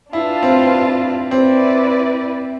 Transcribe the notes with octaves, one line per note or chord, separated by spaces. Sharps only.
D4 E4 F4 B4 F5 A5
C4
C4 E4 B4 D5